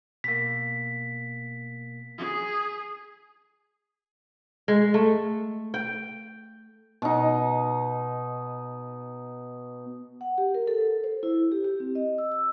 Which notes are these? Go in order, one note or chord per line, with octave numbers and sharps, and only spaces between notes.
B2 A#3 B6
G#4
G#3
A3
G5
B2 D#4
F#5
G4
A#4
A4
C5
E4
G4
G4
C4
D#5
E6
E6